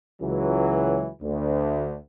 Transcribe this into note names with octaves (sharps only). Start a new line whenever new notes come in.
C#2 E3 F#3
D2